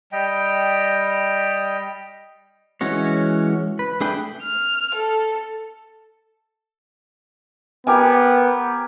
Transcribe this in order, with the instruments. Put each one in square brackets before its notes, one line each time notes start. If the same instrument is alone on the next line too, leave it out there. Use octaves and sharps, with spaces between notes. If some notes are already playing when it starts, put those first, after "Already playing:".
[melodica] G3 D#5 G5
[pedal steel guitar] E3 G#3 C#4 F#4 C#5
B4
A3 D4 G#4 B4 G5
[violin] F6
A4
[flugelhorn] B3 [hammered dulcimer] G4 A#4 G#5